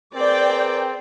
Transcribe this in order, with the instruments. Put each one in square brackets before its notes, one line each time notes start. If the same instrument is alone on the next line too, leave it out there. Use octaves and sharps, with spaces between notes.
[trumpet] C4 [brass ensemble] G#4 A#4 B4 [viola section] D5 G5